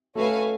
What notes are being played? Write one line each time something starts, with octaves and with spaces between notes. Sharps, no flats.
A3 C#4 F#4 B4 F5 G#5